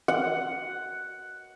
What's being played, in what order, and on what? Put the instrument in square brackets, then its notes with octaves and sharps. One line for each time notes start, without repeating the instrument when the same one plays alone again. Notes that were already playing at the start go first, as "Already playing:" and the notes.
[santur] F#5